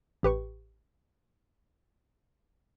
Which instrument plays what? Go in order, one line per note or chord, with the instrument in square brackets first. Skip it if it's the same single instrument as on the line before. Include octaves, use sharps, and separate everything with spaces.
[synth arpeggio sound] A1 G4 B4 C#6